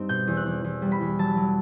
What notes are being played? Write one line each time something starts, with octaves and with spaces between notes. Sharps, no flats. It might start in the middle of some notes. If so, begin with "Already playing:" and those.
Already playing: G2 C4 D#4
B2 G6
E2
F#6
E2
E2
G3
B5
E2
F#3 A5
F#3